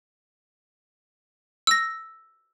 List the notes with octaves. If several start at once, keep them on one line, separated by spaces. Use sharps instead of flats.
E6 A#6